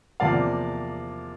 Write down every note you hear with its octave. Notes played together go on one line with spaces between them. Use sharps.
E2 C3 F3 A#3 D5 F5